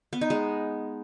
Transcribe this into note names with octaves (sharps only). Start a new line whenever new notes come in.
B3
D#4
G#3